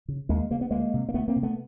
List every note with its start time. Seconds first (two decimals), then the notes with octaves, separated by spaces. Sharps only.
0.08 C#3
0.29 D#2 G#3 A#3
0.51 C#3 A#3
0.61 B3
0.71 D2 G#3 A#3
0.94 C3
1.09 A#3
1.14 D2 A3 B3
1.28 A#3 C4
1.36 C3
1.43 A3 B3